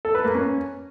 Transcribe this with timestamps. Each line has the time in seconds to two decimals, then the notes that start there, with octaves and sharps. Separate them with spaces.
0.05 A4
0.15 B4
0.24 A#3
0.34 C#4